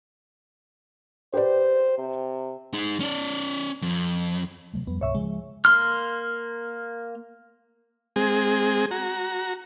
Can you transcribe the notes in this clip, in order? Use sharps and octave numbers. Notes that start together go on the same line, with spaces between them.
G4 B4 C5 D5
C3
D#4 G#4
C#4 D5
F2
C3 F#3 A3
F2 G3 B3
C#2 G#2 C3 C#5 E5 C#6
C#3 E3 F3 G#3
A#3 C6 F6
G#3 C4 G#4
F#4 A#5